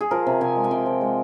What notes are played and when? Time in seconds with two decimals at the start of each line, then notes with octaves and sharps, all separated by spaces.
0.01 G#4
0.11 F3 A#4
0.27 C3
0.41 C3 G#5
0.56 G#3
0.64 G#5
0.71 C3 G5
0.86 F3
1.01 G#3